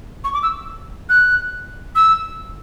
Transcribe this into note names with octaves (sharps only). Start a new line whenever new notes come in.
C#6
D6
E6
F#6
E6